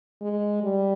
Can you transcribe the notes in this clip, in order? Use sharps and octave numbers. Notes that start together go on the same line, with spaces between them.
G#3
G3